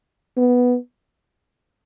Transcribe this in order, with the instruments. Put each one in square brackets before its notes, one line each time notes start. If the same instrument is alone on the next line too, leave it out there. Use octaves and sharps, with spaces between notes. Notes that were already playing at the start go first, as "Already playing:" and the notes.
[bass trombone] B3